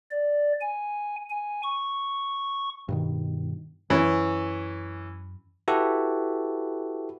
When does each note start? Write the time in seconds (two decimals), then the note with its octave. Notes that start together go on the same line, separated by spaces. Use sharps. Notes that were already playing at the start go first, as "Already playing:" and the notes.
0.11 D5
0.61 G#5
1.29 G#5
1.64 C#6
2.89 G2 B2 D#3
3.90 F#2 E3 C#4
5.68 E4 F#4 G4 A4 B4